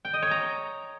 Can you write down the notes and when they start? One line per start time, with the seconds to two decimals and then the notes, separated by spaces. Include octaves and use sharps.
0.05 G5
0.13 D#5
0.22 C#5
0.31 A#5